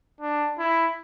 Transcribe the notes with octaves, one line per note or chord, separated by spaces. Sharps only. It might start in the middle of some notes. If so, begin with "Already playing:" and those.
D4
E4